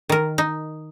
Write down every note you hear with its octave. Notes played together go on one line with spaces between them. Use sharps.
D#3 A#4
D#4